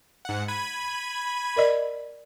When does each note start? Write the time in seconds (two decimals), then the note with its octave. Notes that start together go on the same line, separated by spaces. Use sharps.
0.25 G#2 F#5
0.48 B5 G#6 D#7
1.56 A#4 D5 D#5